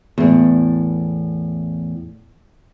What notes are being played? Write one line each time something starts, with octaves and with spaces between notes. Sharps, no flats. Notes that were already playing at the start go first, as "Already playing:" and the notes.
E2 A2